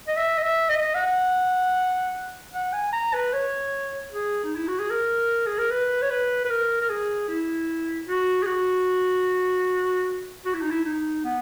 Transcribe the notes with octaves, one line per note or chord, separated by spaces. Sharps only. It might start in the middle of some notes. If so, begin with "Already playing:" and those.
D#5
E5
D#5
E5
D#5
F#5
F#5
G#5
A#5
B4
C#5
G#4
D#4
E4
F#4
G#4
A#4
G#4
A#4
B4
C#5
B4
B4
A#4
A#4
G#4
E4
F#4
G#4
F#4
F#4
E4
D#4
E4
D#4
B3